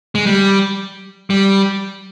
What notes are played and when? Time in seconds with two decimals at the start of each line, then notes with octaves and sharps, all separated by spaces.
0.15 G#3
0.26 G3
1.30 G3